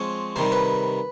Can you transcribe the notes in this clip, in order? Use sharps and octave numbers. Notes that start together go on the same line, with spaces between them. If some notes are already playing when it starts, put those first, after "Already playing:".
Already playing: F3 G#3 C4 C#5
C3 D#3 G3 C5
B4